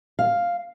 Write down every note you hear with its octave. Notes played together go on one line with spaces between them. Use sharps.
F5